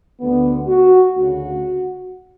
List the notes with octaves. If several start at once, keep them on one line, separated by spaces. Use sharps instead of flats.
D2 D3 B3
F#4
D2 C#3 F#4